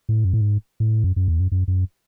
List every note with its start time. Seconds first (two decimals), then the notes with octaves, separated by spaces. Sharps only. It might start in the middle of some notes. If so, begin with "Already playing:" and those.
0.09 A2
0.25 F#2
0.33 A2
0.41 G#2
0.80 A2
1.04 F#2
1.16 F#2
1.28 E2
1.40 F#2
1.52 F#2
1.68 F#2